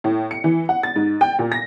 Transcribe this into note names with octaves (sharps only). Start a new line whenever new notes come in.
A2
C#7
E3
F#5
A6
G#2
G5
A#2
A#6